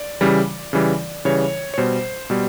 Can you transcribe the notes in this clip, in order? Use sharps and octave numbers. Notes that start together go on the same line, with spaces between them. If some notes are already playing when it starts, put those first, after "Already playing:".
Already playing: D5
C#3 E3 G3
C#3 E3 G3
C#3 E3 G3 C#5
C#5
B2 G3 C5
B2 G3